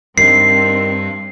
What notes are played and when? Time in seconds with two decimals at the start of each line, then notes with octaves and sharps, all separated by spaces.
0.18 G2 D#3 G3 C4 C7